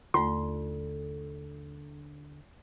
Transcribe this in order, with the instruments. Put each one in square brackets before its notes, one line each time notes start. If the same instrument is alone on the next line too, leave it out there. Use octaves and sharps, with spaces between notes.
[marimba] D#2 A3 [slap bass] D3 [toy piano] F4 [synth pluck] C6